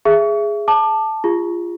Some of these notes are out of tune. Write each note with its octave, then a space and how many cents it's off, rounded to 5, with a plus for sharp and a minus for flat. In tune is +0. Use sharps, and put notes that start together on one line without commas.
G#4 +0 E5 +20
A5 +0 D6 +30
F4 -20 G#4 -45